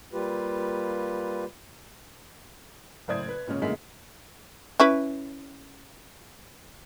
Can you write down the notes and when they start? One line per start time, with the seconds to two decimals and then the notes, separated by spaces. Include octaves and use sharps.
0.13 G3 A#3 F4 G4 B4
3.08 F#1 A2 C5 D5 D#6 G#6
3.29 B4
3.47 A#2 C#3 G#3 C#4
3.61 F#2 A2 D3 G#3 A#3 B6
4.80 C#4 E4 B4